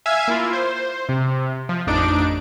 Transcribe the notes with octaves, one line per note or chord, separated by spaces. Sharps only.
E5 F5 G#5 G#6
A#3 E4 F4
C5
C3
F3
A1 F2 D4 D#4 D7